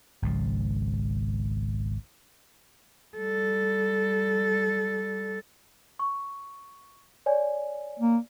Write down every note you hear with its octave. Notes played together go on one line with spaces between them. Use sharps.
G#1 C#2 F3
G3 A4
C#6
C#5 D5 G#5
A#3